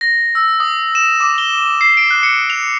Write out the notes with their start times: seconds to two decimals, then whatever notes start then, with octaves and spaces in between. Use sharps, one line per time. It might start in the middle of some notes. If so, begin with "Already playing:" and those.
0.01 A#6
0.35 E6
0.60 D#6
0.95 E7
1.20 D6
1.38 G7
1.81 C7
1.97 D7
2.11 F#6
2.23 C#7
2.50 F7